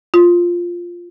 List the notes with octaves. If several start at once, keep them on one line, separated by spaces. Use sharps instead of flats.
F4